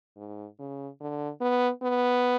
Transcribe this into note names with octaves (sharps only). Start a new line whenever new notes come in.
G#2
C#3
D3
B3
B3